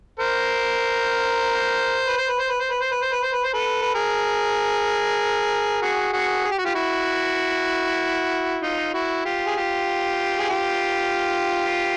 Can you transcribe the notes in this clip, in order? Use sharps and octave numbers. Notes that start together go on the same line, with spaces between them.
A#4 C5
B4
C5
B4
C5
B4
C5
B4
C5
B4
C5
B4
C5
B4
C5
A4 B4
B4
G#4 A#4
F#4 G#4
F#4 G#4
G#4
G4
F#4
F4 G4
E4 F#4
D#4 F4
E4 F#4
F4 G4
G#4
F4 G4
G#4
F4 G4